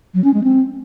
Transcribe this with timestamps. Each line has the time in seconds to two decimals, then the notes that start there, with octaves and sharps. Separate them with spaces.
0.14 F#3
0.24 C#4
0.34 G#3
0.44 C4